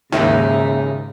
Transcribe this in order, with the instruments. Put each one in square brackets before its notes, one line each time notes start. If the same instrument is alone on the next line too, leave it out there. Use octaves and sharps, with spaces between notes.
[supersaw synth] D#2 [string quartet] G#2 D#4 [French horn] C#3 [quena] E5